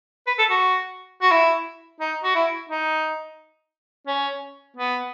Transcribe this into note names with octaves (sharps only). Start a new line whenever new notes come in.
B4
A4
F#4
F#4
E4
D#4
F#4
E4
D#4
C#4
B3